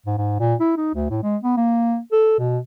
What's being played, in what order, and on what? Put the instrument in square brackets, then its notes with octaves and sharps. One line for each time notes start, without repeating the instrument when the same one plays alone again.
[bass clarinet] G#2
G#2
A#2
E4
D#4
D2
A2
G#3
B3
A#3
A4
B2